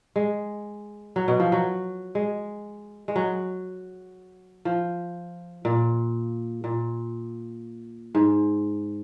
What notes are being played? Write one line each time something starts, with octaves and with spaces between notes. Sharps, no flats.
G#3
F#3
B2
F3
F#3
G#3
G#3
F#3
F3
A#2
A#2
G#2